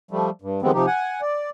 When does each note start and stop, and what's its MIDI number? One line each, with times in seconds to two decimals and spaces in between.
0.11 0.30 53
0.11 0.30 55
0.11 0.30 57
0.42 0.61 43
0.62 0.71 51
0.62 0.71 53
0.62 0.71 55
0.62 0.71 56
0.62 0.71 59
0.62 0.71 60
0.74 0.86 48
0.74 0.86 53
0.74 0.86 63
0.74 0.86 67
0.87 1.21 78
0.87 1.21 80
1.21 1.50 74